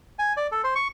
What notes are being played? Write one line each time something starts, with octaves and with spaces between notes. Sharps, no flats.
G#5
D5
A4
C5
C#6